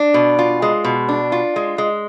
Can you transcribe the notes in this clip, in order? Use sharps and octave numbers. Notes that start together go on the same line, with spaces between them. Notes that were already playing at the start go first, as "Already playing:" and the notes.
Already playing: D4
B2
F4
G#3
B2
D4
F4
G#3
G#3